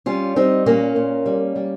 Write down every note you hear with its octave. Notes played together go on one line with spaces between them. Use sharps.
G3 C#4 F4
G3 C4 D#4
A#2 A#3 C#4
A#2
G3
G3